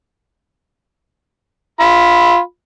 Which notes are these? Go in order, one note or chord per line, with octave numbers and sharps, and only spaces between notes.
F4 B5